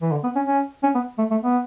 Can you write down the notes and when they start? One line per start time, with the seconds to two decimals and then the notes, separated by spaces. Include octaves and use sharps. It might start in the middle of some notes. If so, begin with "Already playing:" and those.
0.02 E3
0.12 D3
0.24 B3
0.35 C#4
0.47 C#4
0.83 C#4
0.95 B3
1.19 A3
1.31 A3
1.43 B3